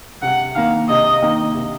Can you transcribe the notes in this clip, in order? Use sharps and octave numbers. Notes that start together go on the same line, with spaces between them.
C3 F#5
D#3 A#3 F5
C3 D#5
D#3 A#3
C3